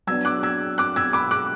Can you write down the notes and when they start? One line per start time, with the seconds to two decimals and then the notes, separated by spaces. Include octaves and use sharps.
0.07 F#3 B3 D4 E6 G#6
0.25 D6 F#6
0.43 E6 G#6
0.78 D6 F#6
0.96 E6 G#6
1.13 B5 D6
1.31 D6 F#6